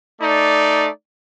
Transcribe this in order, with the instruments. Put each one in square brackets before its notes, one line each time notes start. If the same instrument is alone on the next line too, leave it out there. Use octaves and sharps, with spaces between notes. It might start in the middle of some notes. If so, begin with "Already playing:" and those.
[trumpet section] A3 D#4 D5